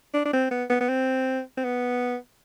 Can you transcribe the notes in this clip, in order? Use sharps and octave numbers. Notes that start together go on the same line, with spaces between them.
D4
D4
C4
B3
B3
B3
C4
C4
B3